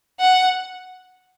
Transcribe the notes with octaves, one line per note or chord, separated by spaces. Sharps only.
F#5